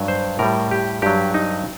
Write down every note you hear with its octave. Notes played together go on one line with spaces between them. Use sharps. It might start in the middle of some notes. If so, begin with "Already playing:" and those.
Already playing: G2 F#3
C5
A2 G3 A#4
G4
G2 F#3 G4
D#4